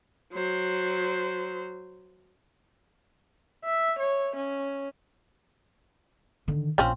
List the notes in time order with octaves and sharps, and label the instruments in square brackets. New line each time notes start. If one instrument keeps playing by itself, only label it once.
[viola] F#3 C5
[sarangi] E5
C#5
C#4
[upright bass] D3 D#3
[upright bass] A#1 [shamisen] F3 C4 C#4